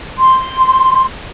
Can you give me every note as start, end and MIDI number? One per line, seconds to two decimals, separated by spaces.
0.19 1.05 84